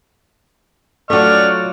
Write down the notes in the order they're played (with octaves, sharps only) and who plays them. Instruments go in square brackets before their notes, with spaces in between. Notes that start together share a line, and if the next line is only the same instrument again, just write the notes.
[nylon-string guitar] F#3 F4 [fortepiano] A3 A4 [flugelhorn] D5 [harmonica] C#6 F6